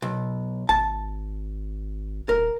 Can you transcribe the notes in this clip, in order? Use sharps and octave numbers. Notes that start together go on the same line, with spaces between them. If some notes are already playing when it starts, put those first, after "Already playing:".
B1
G#1 A5
D#1 A#4